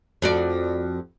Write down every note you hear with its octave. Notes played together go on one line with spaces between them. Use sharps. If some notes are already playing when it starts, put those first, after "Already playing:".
F2 F#4 D5